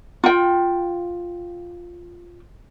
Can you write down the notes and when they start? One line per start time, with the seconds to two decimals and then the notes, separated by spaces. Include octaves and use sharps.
0.24 F4 G5